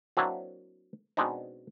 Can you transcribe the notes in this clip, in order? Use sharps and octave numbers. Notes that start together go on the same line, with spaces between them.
F#3 A#3 C4 D4 E4 F#4
B2 G#3 B3 C4 D4 D#4